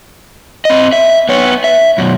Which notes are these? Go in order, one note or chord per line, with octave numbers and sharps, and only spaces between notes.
C4 D#5
E5
B3 C#5
E5
F#2 B2